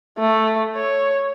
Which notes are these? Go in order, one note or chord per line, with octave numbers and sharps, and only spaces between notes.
A3
C#5